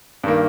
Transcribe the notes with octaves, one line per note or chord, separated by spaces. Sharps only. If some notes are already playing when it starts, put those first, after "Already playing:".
G2 D#3 A#3